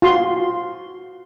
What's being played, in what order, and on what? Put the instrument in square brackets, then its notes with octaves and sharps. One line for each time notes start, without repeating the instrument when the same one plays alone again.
[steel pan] F4 F#4 C6